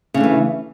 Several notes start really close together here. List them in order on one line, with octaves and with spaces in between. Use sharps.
C#3 D4 A3 E3